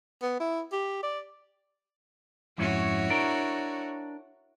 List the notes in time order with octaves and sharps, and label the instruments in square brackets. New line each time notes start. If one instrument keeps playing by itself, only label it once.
[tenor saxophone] B3
E4
G4
D5
[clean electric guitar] F2 G#2 C#4 [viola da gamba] E4 F#4 C#5
[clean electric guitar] D4 A#4